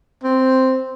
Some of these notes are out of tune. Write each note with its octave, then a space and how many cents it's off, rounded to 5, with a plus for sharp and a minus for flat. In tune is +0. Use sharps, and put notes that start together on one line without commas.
C4 -5